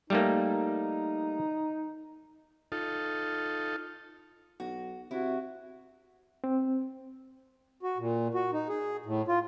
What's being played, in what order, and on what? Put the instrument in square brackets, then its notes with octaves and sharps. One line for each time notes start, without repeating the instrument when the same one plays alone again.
[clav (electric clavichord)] G3 A3 A#3 [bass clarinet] D#4
[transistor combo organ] D#4 F4 A4
[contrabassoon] B1 [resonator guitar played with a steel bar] F#4
[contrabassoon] C3 [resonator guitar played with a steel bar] E4 [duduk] F#4
[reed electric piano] C4
[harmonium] F#4
A#2
F#4
D#4
G#4
A2
F4